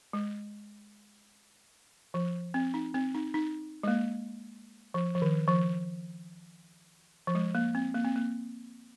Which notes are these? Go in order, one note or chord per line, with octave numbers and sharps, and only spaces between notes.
G#3
F3
C4
D#4
C4
D#4
D#4
G#3
A#3
F3
F3
D#3
F3
F3
G#3
A#3
C4
A#3
C4
A#3